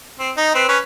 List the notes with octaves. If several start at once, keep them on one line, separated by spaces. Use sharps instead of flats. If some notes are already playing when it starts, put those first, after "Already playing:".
C4
D#4
C4 B4
C#4 B4